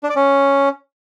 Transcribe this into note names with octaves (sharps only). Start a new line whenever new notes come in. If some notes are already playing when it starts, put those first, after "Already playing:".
D4
D5
C#4